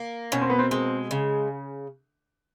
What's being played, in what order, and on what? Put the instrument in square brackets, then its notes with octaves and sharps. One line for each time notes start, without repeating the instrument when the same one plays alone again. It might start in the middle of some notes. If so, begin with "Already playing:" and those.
Already playing: [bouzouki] A#3
[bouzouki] B2 [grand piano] C#4
[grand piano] C4
B3
C4
[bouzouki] G#3 [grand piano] C4
[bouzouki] C#3